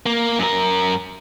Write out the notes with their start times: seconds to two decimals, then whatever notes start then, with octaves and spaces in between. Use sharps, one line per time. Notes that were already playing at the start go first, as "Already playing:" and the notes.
0.06 A#3
0.39 F#2 A#4